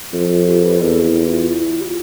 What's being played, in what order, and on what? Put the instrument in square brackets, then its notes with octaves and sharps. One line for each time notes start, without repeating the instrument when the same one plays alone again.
[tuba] F2 [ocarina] F4
[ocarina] F4
G4
B4
[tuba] E2 [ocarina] A4
[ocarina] E4
F4
E4
G4
F4